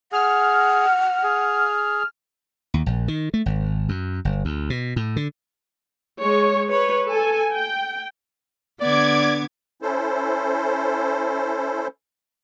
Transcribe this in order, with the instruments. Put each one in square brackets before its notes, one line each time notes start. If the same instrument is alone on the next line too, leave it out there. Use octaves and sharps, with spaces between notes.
[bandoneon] G#4 [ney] F#5 [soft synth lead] F6
[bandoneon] G#4
[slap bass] D#2
A#1
D#3
A3
G#1
F#2
G1
D2
B2
A2
D3
[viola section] G#3 C#5
B4 C#5
A4 G#5
G5
[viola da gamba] D3 B3 [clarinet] D5 [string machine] D6 G#6
[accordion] C#4 E4 A4 C5